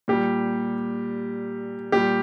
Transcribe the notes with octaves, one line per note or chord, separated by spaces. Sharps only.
A#2 G3 G4
A#2 G3 G4